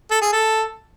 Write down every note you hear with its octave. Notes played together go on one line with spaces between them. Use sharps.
A4
G#4
A4